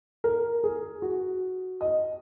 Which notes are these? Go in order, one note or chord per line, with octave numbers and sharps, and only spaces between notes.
A#4
G#4
F#4
D#5